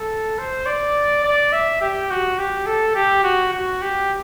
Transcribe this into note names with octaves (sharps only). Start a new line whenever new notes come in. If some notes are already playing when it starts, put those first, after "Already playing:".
Already playing: A4
C5
D5
D5
E5
G4
F#4
G4
A4
G4
F#4
F#4
G4